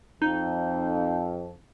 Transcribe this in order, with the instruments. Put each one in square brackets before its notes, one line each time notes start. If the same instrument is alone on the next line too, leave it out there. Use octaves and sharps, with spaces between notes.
[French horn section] F2 [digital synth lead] D#4